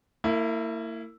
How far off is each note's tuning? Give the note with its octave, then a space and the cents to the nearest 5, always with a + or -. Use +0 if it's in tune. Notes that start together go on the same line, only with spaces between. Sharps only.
A#3 -35 E4 +0